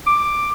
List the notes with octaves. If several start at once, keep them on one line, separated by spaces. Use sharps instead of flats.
D6